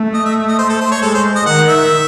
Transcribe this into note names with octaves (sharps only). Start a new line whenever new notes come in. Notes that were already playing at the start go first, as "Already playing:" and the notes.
Already playing: A3
D#5
E5
D#5
C5
A4
C5
C#5
G#3 A4
C5
D#5
D#3 F#5
E5